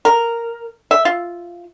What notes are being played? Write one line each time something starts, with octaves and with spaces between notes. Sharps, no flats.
A#4
E5
F4